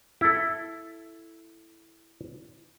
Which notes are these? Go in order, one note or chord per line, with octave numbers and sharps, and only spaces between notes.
E4 A4